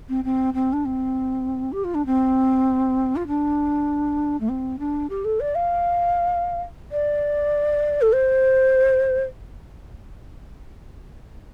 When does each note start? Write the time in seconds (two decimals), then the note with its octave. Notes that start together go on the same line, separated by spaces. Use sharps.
0.09 C4
0.24 C4
0.54 C4
0.73 D4
0.85 C4
1.72 G4
1.84 F4
1.95 D4
2.06 C4
3.16 F4
3.27 D4
4.40 A3
4.49 C4
4.79 D4
5.10 G4
5.25 A4
5.40 D5
5.55 F5
6.92 D5
8.01 A4
8.14 C5